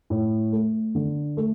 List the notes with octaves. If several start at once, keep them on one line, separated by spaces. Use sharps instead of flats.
A2
A3
D3
A3